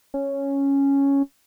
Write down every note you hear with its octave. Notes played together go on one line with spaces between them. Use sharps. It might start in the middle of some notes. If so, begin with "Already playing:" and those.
C#4